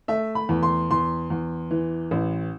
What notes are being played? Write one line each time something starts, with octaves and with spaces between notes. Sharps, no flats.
A3 E5
B5
E2
C6
E2 C6
E2
E3
A1